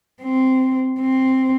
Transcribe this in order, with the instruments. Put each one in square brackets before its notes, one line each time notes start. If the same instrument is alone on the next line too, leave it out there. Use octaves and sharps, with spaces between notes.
[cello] C4
C4